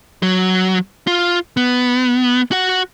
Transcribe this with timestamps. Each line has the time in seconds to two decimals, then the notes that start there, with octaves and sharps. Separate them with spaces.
0.23 F#3
1.07 F4
1.57 B3
2.51 F#4 F#5